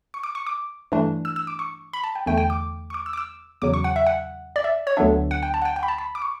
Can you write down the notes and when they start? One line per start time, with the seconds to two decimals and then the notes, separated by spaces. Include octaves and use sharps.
0.14 C#6
0.23 D6
0.35 C#6
0.47 D6
0.92 G2 E3 A3 D4
1.25 E6
1.36 E6
1.47 D6
1.59 C#6
1.93 B5
2.04 A5
2.15 G5
2.26 E2 D3 A3 G5
2.38 G5
2.50 D6
2.90 C#6
2.94 D6
3.06 E6
3.13 D6
3.17 E6
3.62 E2 C#3 F#3 D6
3.74 C#6
3.84 F#5
3.96 E5
4.06 F#5
4.56 D5
4.64 E5
4.87 C#5
4.97 D2 D3 F#3 B3 D4 E5
5.31 F#5
5.43 G5
5.54 A5
5.62 F#5
5.65 G5
5.76 G5
5.83 B5
5.88 A5
5.98 B5
6.15 D6
6.22 C#6